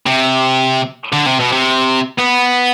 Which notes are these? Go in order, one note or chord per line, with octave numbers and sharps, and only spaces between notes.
C3
D3
C3
B2
C3
B3